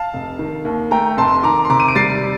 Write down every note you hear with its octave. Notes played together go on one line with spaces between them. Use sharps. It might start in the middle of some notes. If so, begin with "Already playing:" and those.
Already playing: F5 A5
F1
D#3
D#2
A3 G5 A#5
F1 A5 C6
D#3 A#5 D6
C6
C3 A#5 D6
D#7
D7
G3 A6 C7